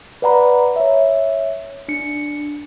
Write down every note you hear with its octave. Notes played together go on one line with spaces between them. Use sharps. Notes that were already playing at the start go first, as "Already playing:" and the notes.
B4 D5 F#5 A#5 B5
C#5 E5
D4 C#7